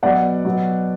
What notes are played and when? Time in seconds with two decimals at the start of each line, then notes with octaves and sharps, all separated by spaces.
0.03 B2 F#3 D5 F#5
0.45 B2 F#3